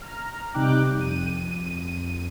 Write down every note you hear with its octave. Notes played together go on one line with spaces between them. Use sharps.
A#5 F6
C3 G3 D#4 G5 D6 F#6
F2 D#7